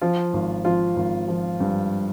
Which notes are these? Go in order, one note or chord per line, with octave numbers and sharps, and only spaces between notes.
F3 F4
G#1
F3 F4
G#1
F3
G2